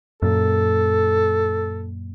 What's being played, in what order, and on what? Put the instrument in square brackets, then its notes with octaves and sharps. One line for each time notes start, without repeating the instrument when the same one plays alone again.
[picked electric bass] F#2 A#2 [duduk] A4